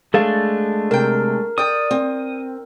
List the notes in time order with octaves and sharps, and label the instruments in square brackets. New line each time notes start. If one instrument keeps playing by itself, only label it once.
[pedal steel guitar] G#3 A3 D4 [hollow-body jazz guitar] G#4 A4 F5
[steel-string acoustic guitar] C3 G5 [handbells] A#4
[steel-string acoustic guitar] D5 G5 [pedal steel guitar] D#6
[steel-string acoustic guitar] C4